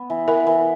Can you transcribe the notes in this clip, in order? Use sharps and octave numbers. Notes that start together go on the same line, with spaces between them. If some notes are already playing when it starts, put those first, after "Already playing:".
Already playing: B3
E3
E3 A#4
E3